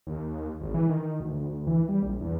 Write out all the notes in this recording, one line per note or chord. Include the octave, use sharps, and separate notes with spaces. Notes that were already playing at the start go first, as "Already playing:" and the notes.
D#2
G#1
E3
D#3
D2
D2
E3
G3
A#1
E2